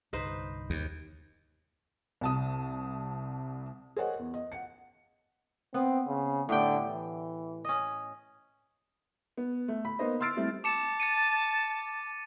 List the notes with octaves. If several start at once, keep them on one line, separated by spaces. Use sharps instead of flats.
C2 G2 D3 D#4 B4 C5
D#2
C2 A5 D#6
G#4 A#4 C5 C#5 D#5 F#5
E2
D#5
F#5 C#7
B3 C4
C#3
A2 D3 G4 G5
E3
C#4 D#5
B3
A3
B5
A#3 B3 D#4 C5 D#5
C6 E6 F6 A6 C7 D7
G3 A3 C4 E4
A5 D6 C#7 E7
A6 C#7 D#7